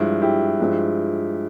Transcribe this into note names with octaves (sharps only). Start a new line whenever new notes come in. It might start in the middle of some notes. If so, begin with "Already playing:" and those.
Already playing: G2 F3 G#3 E4
E4 G4
G2 F3 G#3